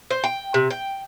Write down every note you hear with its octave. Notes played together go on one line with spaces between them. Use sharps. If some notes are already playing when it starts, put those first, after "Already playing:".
C5
G5
C3
G5